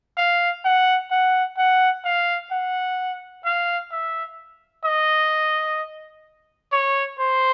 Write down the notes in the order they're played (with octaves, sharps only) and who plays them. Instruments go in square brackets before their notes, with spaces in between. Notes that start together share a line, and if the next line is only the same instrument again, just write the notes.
[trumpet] F5
F#5
F#5
F#5
F5
F#5
F5
E5
D#5
C#5
C5